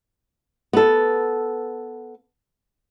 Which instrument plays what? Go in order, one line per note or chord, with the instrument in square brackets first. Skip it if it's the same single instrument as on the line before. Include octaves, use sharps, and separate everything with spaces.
[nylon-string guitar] B3 A4